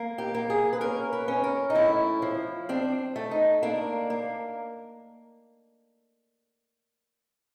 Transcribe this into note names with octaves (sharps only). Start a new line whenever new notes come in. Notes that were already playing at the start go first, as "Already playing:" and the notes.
Already playing: A#3
G4
A#3
G#4
B4
C#4 A#4
B4
C#4
A#4
D#4
A2 E4
F3
C4 D4
A3
D#4
A#3 D4
A#3